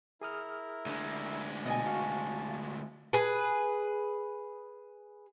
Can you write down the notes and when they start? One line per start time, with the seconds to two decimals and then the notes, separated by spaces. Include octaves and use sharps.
0.21 E4 G#4 A#4 D#6 F6
0.86 D2 G#3
1.66 B2 D#5 G#5 A5
1.86 F#4 F5 C#6
3.13 G#4 B4